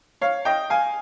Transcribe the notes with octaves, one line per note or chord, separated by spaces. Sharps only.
C#5 F5
D#5 G5
F5 G#5